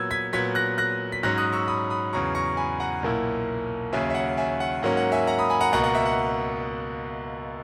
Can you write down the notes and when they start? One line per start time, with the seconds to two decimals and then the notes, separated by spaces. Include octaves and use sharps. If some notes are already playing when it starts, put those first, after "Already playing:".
Already playing: A#2 F#3 B3 E6 G#6
0.11 G#6 B6
0.33 A#2 F#3 B3 G#6 B6
0.55 F#6 A#6
0.78 F#6 A#6
1.12 B6
1.23 G#2 F#3 C#4 F#6 A#6
1.38 D#6 F#6
1.53 C#6 E6
1.68 B5 D#6
1.90 B5 D#6
2.13 E2 C#3 F#3 A#5 C#6
2.35 A#5 C#6
2.57 G#5 B5
2.80 F#5 A#5
3.02 B1 A#2 A#3 E4
3.92 D#2 C#3 F#3 C#4 E5 G#5
4.10 E5
4.15 F#5
4.37 E5 G#5
4.60 F#5
4.82 G#2 F#3 A#3 C#4 F#5
4.97 F#5
5.12 E5 G#5
5.27 F#5 A#5
5.39 B5 D#6
5.50 G#5 B5
5.61 F#5 A#5
5.72 C#2 B2 A#3 F#5 A#5
5.84 F#5
5.95 E5
6.06 F#5